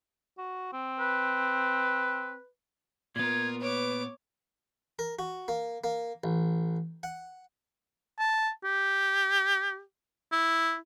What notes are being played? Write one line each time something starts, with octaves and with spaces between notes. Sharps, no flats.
F#4
C4
B4
A#2 B3 F4 A#4 G#6
B4 C#5 D6
A#4
F#4
A#3
A#3
A1
F#5
A5
G4
E4